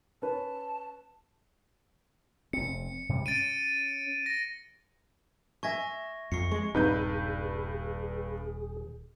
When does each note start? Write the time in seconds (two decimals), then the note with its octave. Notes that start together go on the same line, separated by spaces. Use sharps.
0.22 C#4 B4 A5
2.53 F1 C4 C#7
3.09 G#2 C3 G3
3.26 C#4 A6 D7 D#7
4.26 A#6
5.63 E5 G#5 C#6 G#6 A#6
6.32 F2 C#6 C7 C#7
6.52 G#3 C#6
6.74 D#1 G2 C4 D#4 G#4 B4 G6